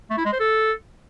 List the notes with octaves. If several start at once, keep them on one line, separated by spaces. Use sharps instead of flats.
A3
E4
G#3
C5
A4